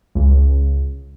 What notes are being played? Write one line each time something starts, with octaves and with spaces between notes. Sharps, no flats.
C#2